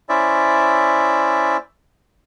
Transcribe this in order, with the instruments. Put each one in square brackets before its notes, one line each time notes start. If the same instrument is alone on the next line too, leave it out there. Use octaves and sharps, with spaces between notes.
[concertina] C#4 E4 C5 D5 E5